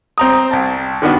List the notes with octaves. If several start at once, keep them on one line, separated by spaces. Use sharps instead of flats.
C4 A#5 D#6
C2 A5
D3 D#3 B3 D4 F#4